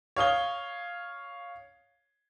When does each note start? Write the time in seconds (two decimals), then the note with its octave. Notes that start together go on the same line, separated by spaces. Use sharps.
0.16 C#5 F5 D#6 G7